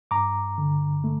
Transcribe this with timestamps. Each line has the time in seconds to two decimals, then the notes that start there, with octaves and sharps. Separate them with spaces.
0.11 G2 A#5 D6
0.58 D3
1.04 A3